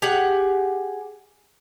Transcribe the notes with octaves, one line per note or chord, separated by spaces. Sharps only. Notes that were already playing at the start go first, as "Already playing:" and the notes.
G4 G#4 F#5